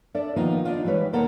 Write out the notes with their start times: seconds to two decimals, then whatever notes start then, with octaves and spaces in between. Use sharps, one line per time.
0.14 D4 A4 D5 E5
0.36 D#3 F3 A#3 B3 D#4 F4
0.65 D4 D#4 F4
0.84 E3 G3 G#3 B4 C#5
1.13 D#2 B2 A#3 A4 A#4 F#5